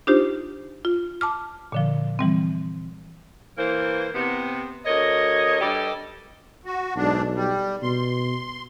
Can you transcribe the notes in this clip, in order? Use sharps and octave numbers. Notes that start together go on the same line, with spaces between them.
D4 D#4 F4 G4 C5
F4
A5 D6 F6
A#2 D3 F3
E3 G3 C4
E3 A#3 C5
C3 B3
D2 A#4 C#5 D#5
G2 G3 G4 A4 D5 D#5
F#4
B1 G#2 D4
G3
B2 C6